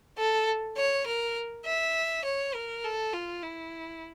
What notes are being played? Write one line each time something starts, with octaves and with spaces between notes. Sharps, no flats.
A4
C#5
A#4
E5
C#5
A#4
A4
F4
E4